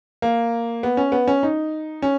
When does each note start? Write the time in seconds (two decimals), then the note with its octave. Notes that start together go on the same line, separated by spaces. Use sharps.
0.22 A#3
0.83 B3
0.97 C#4
1.12 B3
1.28 C#4
1.43 D#4
2.02 C#4